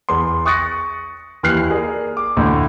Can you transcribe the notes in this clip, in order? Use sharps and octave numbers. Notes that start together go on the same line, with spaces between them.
E2 C6
C#6 D#6 F#6 A6 A#6 C#7
D#2 E3 F6 F#6 C7
G#4 A#4 D5
D6
D2 A2